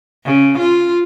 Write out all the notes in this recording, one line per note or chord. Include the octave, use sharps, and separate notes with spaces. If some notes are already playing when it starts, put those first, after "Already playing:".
C#3
F4